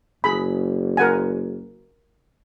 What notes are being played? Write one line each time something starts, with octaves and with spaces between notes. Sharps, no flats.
F#1 G#4 B5
A#4 F#5 G#5